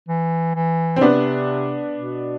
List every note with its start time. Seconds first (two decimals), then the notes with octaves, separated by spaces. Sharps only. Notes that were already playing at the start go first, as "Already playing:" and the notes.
0.08 E3
0.55 E3
0.96 C4
1.01 C3 B3 D4
1.95 B2